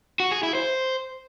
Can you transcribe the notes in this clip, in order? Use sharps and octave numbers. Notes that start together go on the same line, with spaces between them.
F#4
G#4
E4
C5